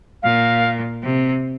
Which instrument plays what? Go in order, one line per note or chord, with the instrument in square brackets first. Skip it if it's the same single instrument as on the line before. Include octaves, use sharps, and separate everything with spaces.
[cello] A#2 [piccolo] F5
[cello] C3